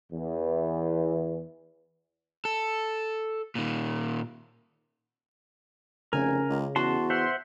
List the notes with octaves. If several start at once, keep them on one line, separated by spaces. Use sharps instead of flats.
E2 E3
A4
A#2 D#3
F1 C#3 A#4 G#5
C#2
E2 F#4 A5 C6
C5 E5 F#5 C6